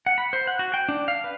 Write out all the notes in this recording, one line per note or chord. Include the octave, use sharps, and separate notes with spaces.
F#5
B5
C5
F#5
F#4
G5
D4
F5
B4